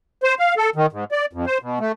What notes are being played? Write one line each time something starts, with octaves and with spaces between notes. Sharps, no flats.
C5
F5
A4
D#3
G#2
D5
F2
C5
B2
A3